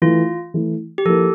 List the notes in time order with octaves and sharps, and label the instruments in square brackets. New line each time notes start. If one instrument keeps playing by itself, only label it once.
[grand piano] E3 A3 E4 [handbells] F4
[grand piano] E3 A3 E4
[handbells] G4
[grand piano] F3 A#3 E4 A#4 [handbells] A4